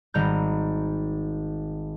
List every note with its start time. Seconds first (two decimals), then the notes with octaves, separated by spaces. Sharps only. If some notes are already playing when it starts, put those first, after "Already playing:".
0.14 G#1 G3 A#5 G6